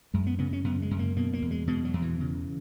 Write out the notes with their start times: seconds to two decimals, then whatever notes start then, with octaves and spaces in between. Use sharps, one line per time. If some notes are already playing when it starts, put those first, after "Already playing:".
0.14 F#2 G#3
0.27 B3
0.39 C#3 B3
0.53 C#4
0.64 F#2 B3
0.82 G#3
0.91 F#2
0.99 A#3
1.17 B2 A#3
1.33 A#3
1.42 E2
1.51 G#3
1.67 B2 G#3
1.85 F#3
1.94 E2
2.02 E3
2.20 C#3